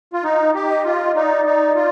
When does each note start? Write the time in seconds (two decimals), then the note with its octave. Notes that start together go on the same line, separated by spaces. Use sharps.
0.13 F4
0.23 D#4 D#5
0.55 G4
0.69 D#5
0.85 F4
0.92 D#5
1.15 D#4 D5
1.45 D#4
1.75 F4